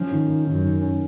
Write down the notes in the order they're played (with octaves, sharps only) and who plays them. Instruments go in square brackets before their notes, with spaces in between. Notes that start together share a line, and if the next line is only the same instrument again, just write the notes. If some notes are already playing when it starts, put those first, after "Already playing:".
Already playing: [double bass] F3 [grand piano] C#4
[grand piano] D#3
D#3
[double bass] F#2 [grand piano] D#3
[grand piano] D#3
C#4